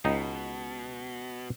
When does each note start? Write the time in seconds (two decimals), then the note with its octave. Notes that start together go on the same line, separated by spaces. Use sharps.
0.05 C#2 B2 D#4